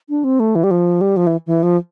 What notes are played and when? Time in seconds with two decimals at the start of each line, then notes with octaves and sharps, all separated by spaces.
0.09 D4
0.24 C4
0.40 A3
0.55 E3
0.63 G3
0.71 F3
1.01 G3
1.16 F3
1.27 E3
1.46 E3
1.63 F3